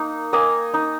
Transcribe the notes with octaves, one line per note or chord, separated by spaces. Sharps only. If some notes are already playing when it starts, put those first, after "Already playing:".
Already playing: A#3 D#4
A#3 D#5 G#5
D#4